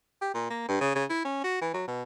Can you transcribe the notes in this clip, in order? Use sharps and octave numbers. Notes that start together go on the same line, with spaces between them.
G4
A#2
A#3
G2
C#3
C#3
E4
C#4
F#4
E3
F#3
B2